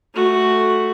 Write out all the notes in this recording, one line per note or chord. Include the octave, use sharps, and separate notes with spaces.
A3 F#4